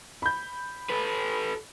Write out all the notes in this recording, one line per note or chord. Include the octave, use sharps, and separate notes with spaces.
B5 G6
A4 B4